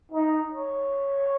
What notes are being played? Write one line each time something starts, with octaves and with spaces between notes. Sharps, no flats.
D#4
C#5